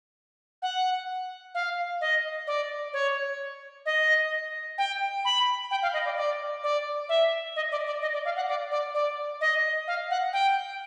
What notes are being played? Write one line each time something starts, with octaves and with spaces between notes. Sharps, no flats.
F#5
F5
D#5
D5
C#5
D#5
G5
B5
G5
F5
D#5
D5
D5
D5
E5
D#5
D5
D5
D#5
D5
F5
F#5
D5
D5
D5
D#5
F5
F#5
G5